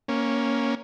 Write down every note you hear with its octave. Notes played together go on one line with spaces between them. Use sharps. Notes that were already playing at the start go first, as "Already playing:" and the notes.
A#3 C#4